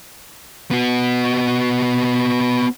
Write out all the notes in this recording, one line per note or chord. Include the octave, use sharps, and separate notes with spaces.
B3 F#4